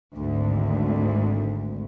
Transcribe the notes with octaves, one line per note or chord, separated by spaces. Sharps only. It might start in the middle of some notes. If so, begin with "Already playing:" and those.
G#1 D2